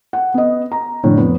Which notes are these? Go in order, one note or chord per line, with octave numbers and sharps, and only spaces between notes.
F#5
B3 D#5
A#5
F2 A2 D3
F2 B3 B4